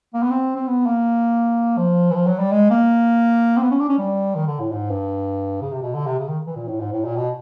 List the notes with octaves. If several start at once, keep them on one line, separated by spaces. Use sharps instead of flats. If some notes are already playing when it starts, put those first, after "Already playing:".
A#3
B3
C4
C4
B3
A#3
F3
E3
F3
F#3
G3
G#3
A#3
C4
B3
C#4
D4
C#4
G3
D#3
D3
A2
G#2
G2
C#3
C3
B2
D3
C3
C#3
D#3
E3
A#2
A2
G#2
A2
A#2
B2